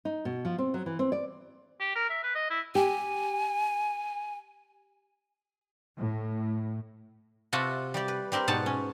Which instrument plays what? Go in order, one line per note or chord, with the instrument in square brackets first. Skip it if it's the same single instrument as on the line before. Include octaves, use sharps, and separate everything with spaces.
[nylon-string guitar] D#4
B2
F3
C4
F#3
E3
C4
D5
[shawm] G4
A#4
E5
B4
D#5
E4
[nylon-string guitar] G4 [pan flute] G#5
[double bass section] A2
[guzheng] C3 F4 F#4 E5 F#5 A5
G3 G4 D5
B4
G3 C4 G4 A#4 C5
G#2 B2 B3 F#5 A5
C#4